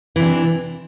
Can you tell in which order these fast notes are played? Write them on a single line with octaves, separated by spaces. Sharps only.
E3 C3 D4